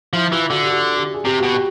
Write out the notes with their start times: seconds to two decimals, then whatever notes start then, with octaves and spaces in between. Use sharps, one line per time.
0.13 F3 E4
0.32 E3 F4
0.51 D3 F#4
0.62 G4
0.69 F#4
0.97 G4
1.14 G#4
1.25 C3 G4
1.39 F#4
1.43 B2 G4
1.54 G4